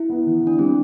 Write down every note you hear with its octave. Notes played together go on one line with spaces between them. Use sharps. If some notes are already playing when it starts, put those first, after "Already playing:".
Already playing: E4
B3
E3
E3 D4
G3 C4